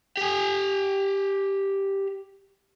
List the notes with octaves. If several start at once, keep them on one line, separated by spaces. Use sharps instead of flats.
G4 G#5